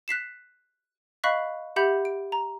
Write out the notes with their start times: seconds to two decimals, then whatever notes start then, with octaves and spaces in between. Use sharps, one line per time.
0.08 F#6 B6 C7 E7
1.24 D#5 F5 B5 C#6 F#6 B6
1.76 G4 E5 F#5 B5 G6
2.05 D7
2.32 A#5